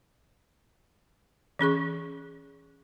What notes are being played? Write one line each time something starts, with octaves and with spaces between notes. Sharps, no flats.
E3 C#4 G#4 C#6